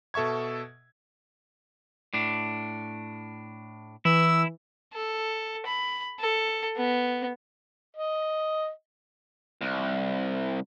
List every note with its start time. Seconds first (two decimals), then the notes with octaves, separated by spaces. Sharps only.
0.14 B2 A4 E5 C#6 G#6
2.14 A2 D4
4.05 E3 E4 E6
4.94 A4
5.66 B5
6.19 A4
6.77 B3
7.97 D#5
9.61 C2